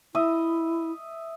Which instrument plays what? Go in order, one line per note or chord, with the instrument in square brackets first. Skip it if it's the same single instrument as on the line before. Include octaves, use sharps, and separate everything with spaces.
[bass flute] E4 [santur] D#5 E5 D#6